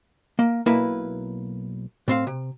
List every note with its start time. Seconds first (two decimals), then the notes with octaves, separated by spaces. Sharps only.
0.39 A#3
0.66 B1 A#3 E4 B4
2.08 A2 C4 F5
2.27 C3